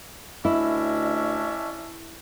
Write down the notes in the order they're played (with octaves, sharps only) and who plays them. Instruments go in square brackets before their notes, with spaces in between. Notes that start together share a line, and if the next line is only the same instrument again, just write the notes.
[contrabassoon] D2 [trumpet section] C#4 D4 E5 [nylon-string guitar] E4 [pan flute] D#5